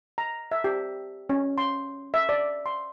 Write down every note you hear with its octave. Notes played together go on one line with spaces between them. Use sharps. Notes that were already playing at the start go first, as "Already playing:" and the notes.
A#5
E5
G4
C#4
C6
E5
D5
C6